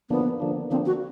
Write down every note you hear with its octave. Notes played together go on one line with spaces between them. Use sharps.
D3 F3 A#3 B3 D4
D3 F3 A#3 D4
D3 F3 A#3 C4 D4
F#4